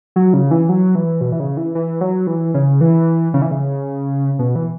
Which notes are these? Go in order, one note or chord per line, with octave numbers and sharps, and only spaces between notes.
F#3
C#3
E3
F#3
E3
B2
E3
C#3
E3
E3
F#3
E3
C#3
E3
C#3
E3
C#3
B2
E3